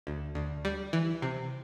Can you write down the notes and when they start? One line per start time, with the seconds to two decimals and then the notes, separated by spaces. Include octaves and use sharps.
0.07 D2
0.35 D2
0.65 G3
0.93 E3
1.22 C3